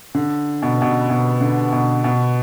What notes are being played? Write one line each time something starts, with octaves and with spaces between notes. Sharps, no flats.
D3
B2
B2
B2
D3
B2
B2